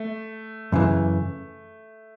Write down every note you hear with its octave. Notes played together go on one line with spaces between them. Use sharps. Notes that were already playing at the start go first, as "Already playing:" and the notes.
Already playing: A3
F#2 C#3 E3